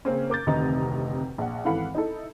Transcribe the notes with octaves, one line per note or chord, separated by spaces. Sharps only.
C#3 A#3 C4 C#4
A#4 D6 G6 A6
F1 D2 C3 D#3 D#5 A#5
A#1 F#5
G#1 E3 A4 F5 F#5 B5
D#4 E4 A4